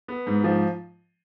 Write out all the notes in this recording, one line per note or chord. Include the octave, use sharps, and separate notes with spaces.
B3
G#2
F3